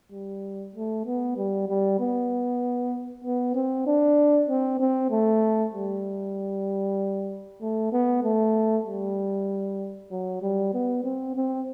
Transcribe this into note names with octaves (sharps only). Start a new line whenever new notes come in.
G3
A3
B3
G3
G3
B3
B3
C4
D4
C4
C4
A3
G3
A3
B3
A3
G3
F#3
G3
B3
C4
C4